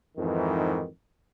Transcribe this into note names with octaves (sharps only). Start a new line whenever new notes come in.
F2 G#2 D#3 E3